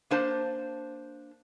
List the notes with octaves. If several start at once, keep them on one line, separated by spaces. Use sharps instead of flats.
A#3 D4 C5 A5